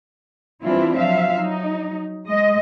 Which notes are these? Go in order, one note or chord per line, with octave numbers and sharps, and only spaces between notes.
E3 G3 C4 D4 E4 F4
F3 F#3 E5 F5
F#3 D#4
G#3 D#5